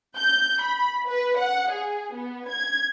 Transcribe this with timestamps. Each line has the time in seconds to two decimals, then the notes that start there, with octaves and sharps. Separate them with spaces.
0.18 G6
0.64 B5
1.08 B4
1.38 F#5
1.72 G#4
2.14 B3
2.49 G#6